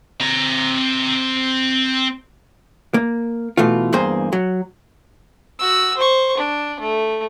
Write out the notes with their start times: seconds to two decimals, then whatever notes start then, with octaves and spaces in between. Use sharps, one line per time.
0.21 C4 A#5
2.94 A#3
3.57 B2 E3 A3 F4
3.93 E2 G2 A#3 G#4 C5
4.33 F#3
5.59 F#4 E6
5.97 C5 C#6
6.38 D4
6.80 A3